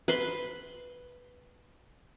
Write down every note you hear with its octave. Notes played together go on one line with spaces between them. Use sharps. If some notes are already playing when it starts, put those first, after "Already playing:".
B4 C6